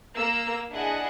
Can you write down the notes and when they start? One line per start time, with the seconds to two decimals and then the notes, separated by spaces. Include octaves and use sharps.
0.15 A#3 A#5 E6
0.72 D4 E4 G#4 D#5 F#5